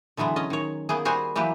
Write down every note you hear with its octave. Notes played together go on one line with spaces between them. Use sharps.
D3 E3 F#3 G#3 B3
C#4 D#5
D#3 C#5
A#3 B3 G#4
G3 F#4 G#4 C5 G#5
E3 F#3 A#3 G4 B4